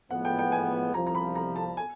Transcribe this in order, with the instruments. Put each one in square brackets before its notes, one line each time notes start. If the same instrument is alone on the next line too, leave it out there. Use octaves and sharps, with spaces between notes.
[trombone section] A2 F3 G#3 B3 [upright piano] F#5
[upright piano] G5
G5
G#5
[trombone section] C2 C3 F3 [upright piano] A#5
[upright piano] A#5
B5
A#5
A5
G#5